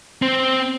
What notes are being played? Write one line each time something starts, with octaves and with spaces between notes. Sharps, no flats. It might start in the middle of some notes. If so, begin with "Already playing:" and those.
C4